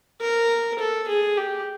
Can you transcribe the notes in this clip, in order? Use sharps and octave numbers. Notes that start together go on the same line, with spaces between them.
A#4
A4
G#4
G4